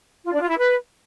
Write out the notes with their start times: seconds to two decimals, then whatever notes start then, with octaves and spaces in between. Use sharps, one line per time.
0.25 F4
0.33 D4
0.41 F4
0.49 E4
0.57 B4